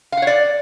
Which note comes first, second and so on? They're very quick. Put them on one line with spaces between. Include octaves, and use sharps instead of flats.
F5 F#5 C#5 D5